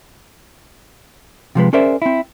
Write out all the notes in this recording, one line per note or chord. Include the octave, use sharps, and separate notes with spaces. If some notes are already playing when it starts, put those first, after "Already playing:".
C3 F3 G#3 B4
C#4 G#4 A#4 C5 D5 E5
C4 E4